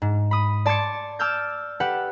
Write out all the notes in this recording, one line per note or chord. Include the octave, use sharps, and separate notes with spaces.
G#2
B5 D#6
D5 A5 C6 D6 G#6 C#7
A5 D6 E6 F6 G6 G#6
G4 A4 B4 F#5